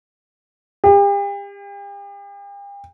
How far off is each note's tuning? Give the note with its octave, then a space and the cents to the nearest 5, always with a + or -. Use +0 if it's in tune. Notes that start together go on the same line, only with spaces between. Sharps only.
G4 +40